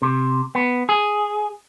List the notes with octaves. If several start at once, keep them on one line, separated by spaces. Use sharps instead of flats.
C3
B3
G#4